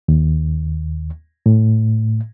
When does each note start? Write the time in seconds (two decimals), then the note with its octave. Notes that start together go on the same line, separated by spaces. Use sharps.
0.08 D#2
1.46 A2